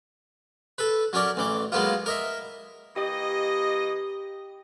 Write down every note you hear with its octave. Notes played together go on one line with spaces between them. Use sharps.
A4 B4
F#3 C#4 A#4 D5
A1 E3 D6
F#3 G#3 A#3 B3 F4
A#4 D#5 E5
E3 A#3 G4 D#5